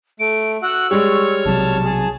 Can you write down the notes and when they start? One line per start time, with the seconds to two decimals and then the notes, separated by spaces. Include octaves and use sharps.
0.20 A3 D7
0.62 F#4 F#5 E6
0.91 G3 G#3 C#5 C#6 F6
1.45 B1 C3 F#3 A5
1.85 G#4